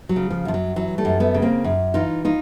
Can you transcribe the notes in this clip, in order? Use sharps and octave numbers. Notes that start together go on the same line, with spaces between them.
F#3
C#3
F3
F#2 F3
F#3
E3 F#3
G3 A3
F#2
A3 B3
C#3
A#3 C4
F#2
E3 D#4 F4
D#4 F4